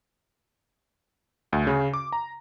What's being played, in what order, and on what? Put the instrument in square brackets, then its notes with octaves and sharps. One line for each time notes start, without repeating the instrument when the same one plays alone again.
[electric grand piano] D2
C#3
D6
A#5